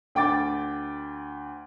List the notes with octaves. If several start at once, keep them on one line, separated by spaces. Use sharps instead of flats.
D2 G5 D6 A6